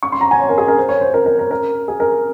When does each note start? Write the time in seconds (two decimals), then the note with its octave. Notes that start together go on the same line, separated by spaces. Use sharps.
0.03 C#6
0.12 C6
0.21 A#5
0.31 G#5
0.40 C#5
0.49 A#4
0.58 G#4
0.68 A#4
0.77 C5
0.89 C#5
1.01 C5
1.14 A#4
1.26 A#4
1.39 A#4
1.51 A#4
1.88 G#4
2.00 A#4